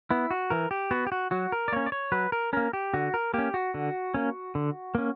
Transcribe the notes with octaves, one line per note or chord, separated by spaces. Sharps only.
B3 E4
F#4
E3 A#4
G4
B3 F#4
G4
F#4
F#3 F#4
A#4
D5
A#3 C#4 C#5
D5
C#5
F#3 B4
A#4
A#3 C#4 A#4
G4
D3 F#4
A#4
A#3 C#4 G4
F#4
D3
A#3 C#4
D3
A#3 C#4